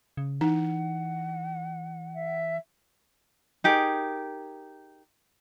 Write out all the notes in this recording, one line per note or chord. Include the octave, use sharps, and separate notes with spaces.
C#3
E3 D#4 F#5
E5
D#4 G4 G#4 A#4